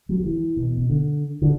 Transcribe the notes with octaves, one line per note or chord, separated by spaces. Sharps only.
F#3
F#3
E3
B2
B2
D3
D3